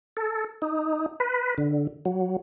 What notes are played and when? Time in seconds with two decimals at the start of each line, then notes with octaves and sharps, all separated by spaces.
0.17 A4
0.62 D#4
1.20 B4
1.58 D3
2.06 F#3